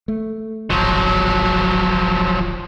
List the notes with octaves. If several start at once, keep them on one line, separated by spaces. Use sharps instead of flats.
A3
D1 G#1 F3 F#3